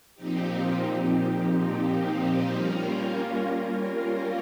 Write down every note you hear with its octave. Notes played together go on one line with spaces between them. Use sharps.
A#2 F3 C4 D#4 G4
G3 A#3 C#4 F4 A#4